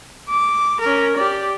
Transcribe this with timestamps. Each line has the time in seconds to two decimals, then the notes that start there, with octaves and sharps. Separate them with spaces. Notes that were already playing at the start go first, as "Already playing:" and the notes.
0.30 D6
0.81 C#4 A#4
1.16 G4 D5